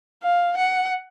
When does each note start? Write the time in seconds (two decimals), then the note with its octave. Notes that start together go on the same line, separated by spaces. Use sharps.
0.23 F5
0.57 F#5